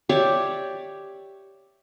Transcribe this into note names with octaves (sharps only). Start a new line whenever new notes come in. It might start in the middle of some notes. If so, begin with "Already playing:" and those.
G4 C#5 D5 E5